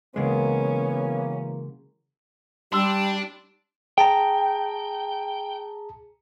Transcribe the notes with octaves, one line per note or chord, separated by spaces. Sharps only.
C#3 E3 F#3 G#3 A#3 B3 C#4
G3 D4 G4 C6 E6
G#4 G5 A5 A#5